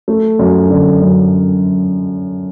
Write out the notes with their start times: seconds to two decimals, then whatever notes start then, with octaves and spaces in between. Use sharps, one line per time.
0.08 A3
0.39 F#2
0.71 D3
1.02 F#2